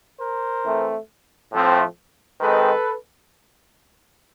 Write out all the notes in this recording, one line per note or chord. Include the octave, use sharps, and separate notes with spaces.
A#4 C5
E3 A3 C4
A2 F3 A3 C4
D#3 G#3 C4 A4 B4